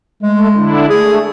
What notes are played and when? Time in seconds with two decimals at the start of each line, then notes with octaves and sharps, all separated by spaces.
0.23 G#3 A3
0.55 D3 D4 E4
0.90 A3 G#4